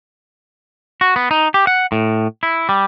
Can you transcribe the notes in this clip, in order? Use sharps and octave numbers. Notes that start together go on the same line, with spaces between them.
F#4
B3
D#4
G4
F#5
A2
E4
G3